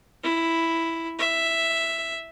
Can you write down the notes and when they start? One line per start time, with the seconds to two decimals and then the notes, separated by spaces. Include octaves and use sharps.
0.24 E4
1.19 E5